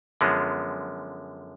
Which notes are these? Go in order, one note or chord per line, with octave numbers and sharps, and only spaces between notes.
F#2 D3 F3 G#3 B3